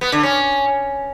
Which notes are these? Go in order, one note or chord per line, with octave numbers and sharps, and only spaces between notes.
B3
D3
C#4